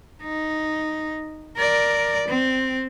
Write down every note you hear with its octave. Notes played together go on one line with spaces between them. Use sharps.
D#4
A#4 D5
C4